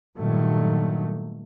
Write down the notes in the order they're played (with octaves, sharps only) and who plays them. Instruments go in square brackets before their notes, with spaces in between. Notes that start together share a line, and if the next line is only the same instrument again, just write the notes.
[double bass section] G2 A#2 D#3 F#3 A3